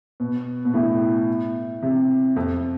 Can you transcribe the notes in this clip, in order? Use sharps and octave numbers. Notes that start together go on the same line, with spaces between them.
B2
B2
A2
C3
F2